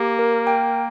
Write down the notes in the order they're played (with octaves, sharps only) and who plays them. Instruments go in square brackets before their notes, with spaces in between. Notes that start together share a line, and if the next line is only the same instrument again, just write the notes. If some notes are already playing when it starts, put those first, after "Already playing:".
Already playing: [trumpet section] A#3 [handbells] G4
[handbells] A#4
G5